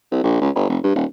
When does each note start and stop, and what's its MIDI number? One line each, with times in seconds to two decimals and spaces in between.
0.12 0.22 36
0.24 0.41 34
0.41 0.50 37
0.55 0.67 31
0.69 0.79 29
0.83 0.95 43
0.95 1.05 27